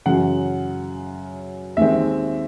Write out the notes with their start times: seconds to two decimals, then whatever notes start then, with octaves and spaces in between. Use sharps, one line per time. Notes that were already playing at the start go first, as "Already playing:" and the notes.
0.06 F#2 C#3 E3 F#5
1.77 D#2 D#3 G#3 C4 E5